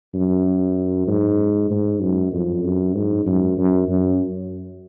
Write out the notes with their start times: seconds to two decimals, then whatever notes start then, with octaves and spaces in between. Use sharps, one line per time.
0.14 F#2
1.07 G#2
1.70 G#2
2.01 F#2
2.33 F2
2.64 F#2
2.96 G#2
3.26 F#2
3.58 F#2
3.88 F#2